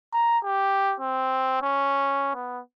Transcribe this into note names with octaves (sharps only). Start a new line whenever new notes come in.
A#5
G4
C4
C#4
B3